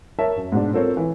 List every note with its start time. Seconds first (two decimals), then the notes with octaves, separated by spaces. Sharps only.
0.19 A#4 C#5 E5 A5
0.36 F#2
0.52 G#2 B2 D4
0.73 C4 F4 A4 A#4 C5 C#5
0.97 E3